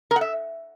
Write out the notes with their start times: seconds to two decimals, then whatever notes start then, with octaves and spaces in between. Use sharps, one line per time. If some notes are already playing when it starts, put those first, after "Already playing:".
0.11 A#4
0.16 F#5
0.21 E5